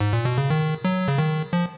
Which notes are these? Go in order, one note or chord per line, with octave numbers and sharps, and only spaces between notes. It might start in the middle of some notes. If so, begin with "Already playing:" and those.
G#2
A#2
B2
C#3
D#3
F#3
C#3
D#3
F3